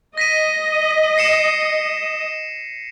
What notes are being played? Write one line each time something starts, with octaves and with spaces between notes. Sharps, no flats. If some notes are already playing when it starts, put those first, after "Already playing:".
D#5 A#6 B6 D#7
C7 C#7 E7